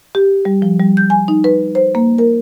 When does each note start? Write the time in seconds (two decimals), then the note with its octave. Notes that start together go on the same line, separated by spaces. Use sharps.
0.15 G4
0.45 G3
0.62 F3
0.80 G3
0.97 G6
1.10 G#5
1.28 D#4
1.44 B4
1.75 C5
1.95 A#3
2.18 A#4